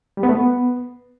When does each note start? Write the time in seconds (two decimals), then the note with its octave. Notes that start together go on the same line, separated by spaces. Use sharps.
0.17 G3
0.23 B3
0.29 A3
0.35 B3